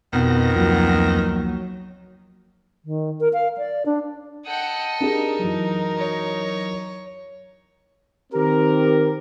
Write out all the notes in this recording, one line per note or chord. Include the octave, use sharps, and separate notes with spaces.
F2 B2 D#3 B3 A#6
C#2 F3 F#3 A#3
D#3
A#4
F5
D5
D4
A4 D#5 F#5 G5
D4 D#4 G4 G#4 A#4
F#2 E3
C#5
D#3 C4 G4 A#4